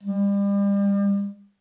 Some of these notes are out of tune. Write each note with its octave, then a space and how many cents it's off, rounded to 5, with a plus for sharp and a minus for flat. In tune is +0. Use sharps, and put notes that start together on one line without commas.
G3 +35